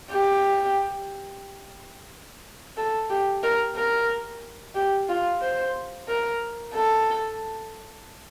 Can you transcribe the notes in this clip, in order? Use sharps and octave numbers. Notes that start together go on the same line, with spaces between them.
G4
A4
G4
A#4
A#4
G4
F4
C5
A#4
A4